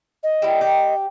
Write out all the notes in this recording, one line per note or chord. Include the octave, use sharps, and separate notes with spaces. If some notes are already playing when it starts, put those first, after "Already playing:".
D#5
G3 E4
G4